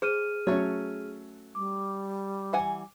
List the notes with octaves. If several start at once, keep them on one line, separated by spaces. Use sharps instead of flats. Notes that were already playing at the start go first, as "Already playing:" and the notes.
G#4 C5 F6 D#7
F#3 A3 C#4 C#5
G3 D6
E3 F#5 G#5